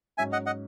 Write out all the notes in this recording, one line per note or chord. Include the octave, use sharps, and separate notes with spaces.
G#2 F#3 C#4 E5 G#5
D#5 F#5
D#5 F#5